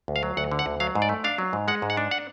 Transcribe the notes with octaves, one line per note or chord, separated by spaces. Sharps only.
D2
F5
F#3
D2 F#5
D3
F#5
D2
F#3 F5
G#2
D5
A3
D4 F5
F#3
G#2
G#3 F#5
G#2
F#5
D4
F#5